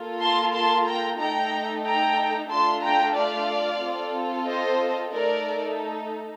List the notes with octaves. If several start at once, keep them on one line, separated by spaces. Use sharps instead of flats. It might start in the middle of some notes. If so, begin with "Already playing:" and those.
Already playing: A#3 F4 A4
A5 C6
A5 C6
G5 A#5
A3 D#4 A4 G5 A#5
G5 A#5
A3 D4 F4 A4 A5 C6
G5 A#5
D5 F5
C4 F4 A4
C5 D#5
A3 D#4 A4 A#4 D5